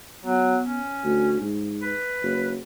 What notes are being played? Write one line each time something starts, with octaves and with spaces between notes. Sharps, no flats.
F#3 B3
C#4
D2
G#2
B4
F#1